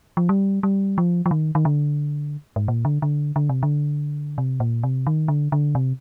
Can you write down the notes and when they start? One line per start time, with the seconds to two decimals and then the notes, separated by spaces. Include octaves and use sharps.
0.17 F3
0.29 G3
0.63 G3
0.98 F3
1.26 F3
1.31 D#3
1.55 D#3
1.65 D3
2.56 G#2
2.68 A#2
2.85 D3
3.02 D3
3.36 D3
3.49 C3
3.63 D3
4.38 C3
4.60 A#2
4.83 C3
5.07 D#3
5.28 D3
5.52 D3
5.75 C3